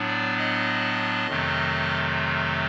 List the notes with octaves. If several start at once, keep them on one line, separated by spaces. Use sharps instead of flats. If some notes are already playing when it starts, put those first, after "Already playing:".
Already playing: A2 F#3 B3 D4
D5
D#5
F2 C3 D#3 F#3 A3